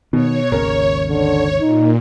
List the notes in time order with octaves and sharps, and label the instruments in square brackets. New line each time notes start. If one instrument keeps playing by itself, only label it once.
[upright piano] B2 [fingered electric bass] D#3 [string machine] C#5
[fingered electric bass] G#1 D#2 C#3 [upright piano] A#4
[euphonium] D3 [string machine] C#5
[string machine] A#2 [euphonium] D#4